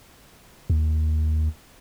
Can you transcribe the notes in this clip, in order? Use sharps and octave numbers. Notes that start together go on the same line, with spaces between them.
D#2